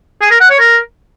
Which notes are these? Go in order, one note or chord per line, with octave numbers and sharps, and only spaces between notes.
G#4
A#4
F#5
C#5
A#4